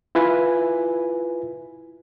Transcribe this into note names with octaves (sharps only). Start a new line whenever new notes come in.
E4 F4 B4 G#5